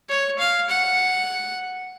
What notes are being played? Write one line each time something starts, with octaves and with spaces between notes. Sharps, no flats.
C#5
F5
F#5